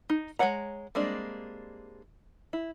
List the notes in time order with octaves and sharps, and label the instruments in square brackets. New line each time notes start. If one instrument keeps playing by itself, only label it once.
[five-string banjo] D#4
G#3 C5 C#5 F#5 A#5
G3 G#3 A#3 C4 D4
E4